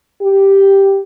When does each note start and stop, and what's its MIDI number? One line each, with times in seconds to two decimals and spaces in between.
0.22 1.01 67